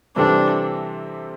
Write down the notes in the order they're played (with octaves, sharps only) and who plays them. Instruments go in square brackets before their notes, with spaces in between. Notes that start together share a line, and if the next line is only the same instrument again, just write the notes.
[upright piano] C3 E3 G3 C4 A4 [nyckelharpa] D4